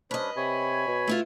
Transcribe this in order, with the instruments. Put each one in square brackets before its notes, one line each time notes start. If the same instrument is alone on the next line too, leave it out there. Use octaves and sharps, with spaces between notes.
[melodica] G3 C#4 D4 [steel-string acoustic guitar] B4 D#5 [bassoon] C5
[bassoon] C3 [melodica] C#5 G#5 B5
[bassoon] B2
[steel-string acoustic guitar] A3 E4 F4